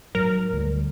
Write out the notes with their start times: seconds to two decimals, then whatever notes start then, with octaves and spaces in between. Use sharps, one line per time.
0.15 G#2 F#3 A#4
0.53 D2 G3